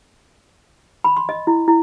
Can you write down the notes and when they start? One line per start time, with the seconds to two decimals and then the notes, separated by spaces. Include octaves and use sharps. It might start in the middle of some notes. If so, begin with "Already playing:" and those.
1.04 B5
1.17 C6
1.29 D#5
1.47 E4
1.68 E4